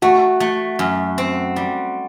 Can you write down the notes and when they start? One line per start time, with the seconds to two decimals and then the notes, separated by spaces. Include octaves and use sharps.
0.02 A3 F#4
0.40 A3
0.79 F#2
1.18 C4
1.56 G3